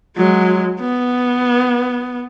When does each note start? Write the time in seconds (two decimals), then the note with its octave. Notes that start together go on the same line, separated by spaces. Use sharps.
0.17 F#3 G#3
0.80 B3